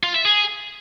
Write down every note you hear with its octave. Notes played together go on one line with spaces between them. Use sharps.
F4
E5
G#4